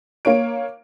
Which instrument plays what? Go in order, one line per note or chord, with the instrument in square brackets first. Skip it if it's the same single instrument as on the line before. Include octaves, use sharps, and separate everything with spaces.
[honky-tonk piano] A#3 C#5 D7